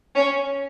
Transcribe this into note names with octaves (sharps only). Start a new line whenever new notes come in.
C#4